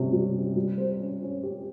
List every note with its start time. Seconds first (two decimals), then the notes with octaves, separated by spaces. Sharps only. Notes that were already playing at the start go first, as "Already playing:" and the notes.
Already playing: C3 G3 C#4
0.12 G3
0.33 C#4
0.56 G3
0.78 C5
1.00 C#4
1.22 C#4
1.43 G4